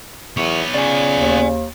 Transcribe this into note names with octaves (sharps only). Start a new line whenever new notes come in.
E2 B3 C#5
C#3 D5 G#5
D#2